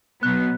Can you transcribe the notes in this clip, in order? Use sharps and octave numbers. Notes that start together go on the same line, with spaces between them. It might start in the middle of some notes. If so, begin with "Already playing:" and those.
B2 F#3 B3 F#6